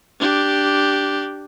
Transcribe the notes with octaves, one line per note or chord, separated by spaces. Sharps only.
D4 G4